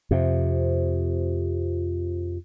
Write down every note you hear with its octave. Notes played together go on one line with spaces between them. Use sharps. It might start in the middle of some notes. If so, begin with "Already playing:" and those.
F2 C3